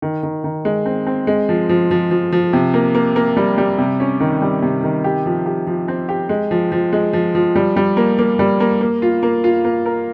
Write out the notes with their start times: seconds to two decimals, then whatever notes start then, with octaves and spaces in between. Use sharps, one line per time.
0.02 D#3
0.23 D#3
0.44 D#3
0.65 G#3
0.86 C4
1.07 C4
1.27 G#3
1.49 F3
1.69 F3
1.91 F3
2.11 F3
2.32 F3
2.53 C3
2.74 A#3
2.95 A#3
3.16 A#3
3.37 G3
3.58 G3
3.78 C3
4.00 C#4
4.20 D#3
4.42 G3
4.62 C3
4.83 D#3
5.04 G4
5.26 F3
5.46 G4
5.67 F3
5.88 C4
6.09 G4
6.29 G#3
6.51 F3
6.72 F3
6.93 G#3
7.13 F3
7.35 F3
7.55 G3
7.76 G3
7.97 A#3
8.18 A#3
8.39 G3
8.60 A#3
8.81 A#3
9.02 F4
9.23 A#3
9.44 F4
9.64 A#3
9.86 A#4